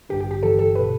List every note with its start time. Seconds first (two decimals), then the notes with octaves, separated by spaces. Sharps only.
0.09 A1 G2 D3 G4
0.20 G4
0.31 G4
0.42 G1 G2 E3 A4
0.59 A4
0.75 B2 B4